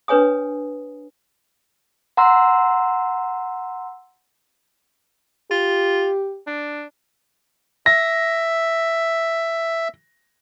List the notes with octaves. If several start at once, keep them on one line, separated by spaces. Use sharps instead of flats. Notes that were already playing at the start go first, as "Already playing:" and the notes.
D4 B4 C#5 G#5 D#6
F#5 A#5 C6 E6
F4 G4
D4
E5 A#6